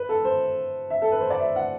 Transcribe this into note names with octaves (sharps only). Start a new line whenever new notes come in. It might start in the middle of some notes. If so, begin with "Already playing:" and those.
Already playing: B4
A4
C5
E5
A4
B4
C5
D5
E5
F#5